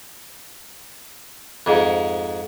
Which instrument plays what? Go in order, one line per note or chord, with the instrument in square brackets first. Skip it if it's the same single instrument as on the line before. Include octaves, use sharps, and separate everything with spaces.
[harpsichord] F2 G#2